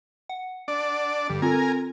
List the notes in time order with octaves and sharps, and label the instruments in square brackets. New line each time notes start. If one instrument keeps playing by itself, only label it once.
[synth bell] F#5
[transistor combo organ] D4 D5
[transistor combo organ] G2 [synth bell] D3
[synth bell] C4 F4 A4 [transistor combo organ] A#4 G#5